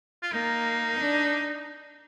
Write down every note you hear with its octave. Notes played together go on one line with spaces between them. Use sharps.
F4
A#3 D#4
D4